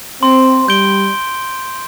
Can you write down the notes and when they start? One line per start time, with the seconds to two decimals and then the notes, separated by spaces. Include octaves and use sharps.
0.23 C4 C6
0.68 G3 G6 D7 G7